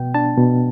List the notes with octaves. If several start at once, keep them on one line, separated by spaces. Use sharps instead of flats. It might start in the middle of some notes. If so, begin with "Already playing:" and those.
Already playing: B2 B3 G5
D4 A5
B2